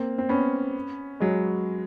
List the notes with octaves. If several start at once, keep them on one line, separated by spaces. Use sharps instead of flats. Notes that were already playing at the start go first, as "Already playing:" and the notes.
Already playing: A#3 C4
C4
B3 C#4
F#3 G#3